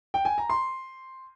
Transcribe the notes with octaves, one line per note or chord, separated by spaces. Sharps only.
G5
G#5
A#5
C6